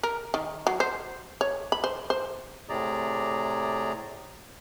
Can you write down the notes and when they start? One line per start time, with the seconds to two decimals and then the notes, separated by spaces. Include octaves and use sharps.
0.03 A#4
0.34 D#3
0.67 F#3
0.80 C5
1.41 C#5
1.72 B5
1.84 C5
2.10 C5
2.69 A2 C3 G#4 D5 A#5